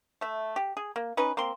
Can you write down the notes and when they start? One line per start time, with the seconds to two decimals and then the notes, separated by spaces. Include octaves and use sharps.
0.21 A3 E5
0.56 G4
0.77 G#4
0.96 A#3
1.17 C#4 D#4 B4
1.37 A#3 C4 C6